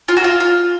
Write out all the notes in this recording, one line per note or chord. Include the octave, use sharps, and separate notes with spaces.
F4
F#4
F4
F4